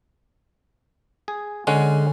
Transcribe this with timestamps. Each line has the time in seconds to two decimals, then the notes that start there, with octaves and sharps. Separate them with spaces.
1.28 G#4
1.67 D3 G#3 C#4 F#5